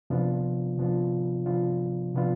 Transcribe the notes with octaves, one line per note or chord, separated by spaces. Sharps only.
C3 F3 B3 D4 F4
C3 F3 B3 D4 F4
C3 F3 B3 D4 F4
C3 F3 B3 D4 F4